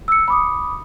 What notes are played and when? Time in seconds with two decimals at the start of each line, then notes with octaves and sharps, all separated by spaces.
0.08 E6 C#7
0.28 B5 D6 D#6